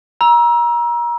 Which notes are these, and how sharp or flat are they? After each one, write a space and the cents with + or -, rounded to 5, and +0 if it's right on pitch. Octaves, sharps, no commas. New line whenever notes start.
A#5 +30 E6 +0